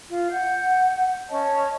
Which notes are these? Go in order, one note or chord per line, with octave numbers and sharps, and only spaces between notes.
F4
F#5 G6
C#4 C#5 D#5 A5